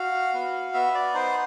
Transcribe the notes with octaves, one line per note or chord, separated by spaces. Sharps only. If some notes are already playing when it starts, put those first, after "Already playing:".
Already playing: F#4 F5
B3
B3 E5
D5
D#4 C5